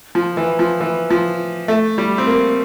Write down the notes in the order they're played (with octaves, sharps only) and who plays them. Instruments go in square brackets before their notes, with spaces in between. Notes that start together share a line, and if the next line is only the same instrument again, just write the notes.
[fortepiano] F3
E3
F3
E3
F3
A3
G3
C4
A#3